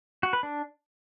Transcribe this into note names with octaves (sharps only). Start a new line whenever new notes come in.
F#4
B4
D4